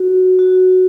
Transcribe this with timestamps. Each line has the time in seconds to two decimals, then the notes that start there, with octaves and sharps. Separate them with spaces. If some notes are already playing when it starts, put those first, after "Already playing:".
Already playing: F#4
0.39 F#4